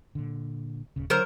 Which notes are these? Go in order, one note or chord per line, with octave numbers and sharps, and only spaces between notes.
A#2 D3
D#1 C#3
D3 F#3 A#4 C5